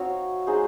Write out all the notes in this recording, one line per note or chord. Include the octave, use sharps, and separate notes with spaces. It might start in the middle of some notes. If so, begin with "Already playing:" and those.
Already playing: C4 D#4 F#4 C#5 F5
G#3 D#4 G#4 C5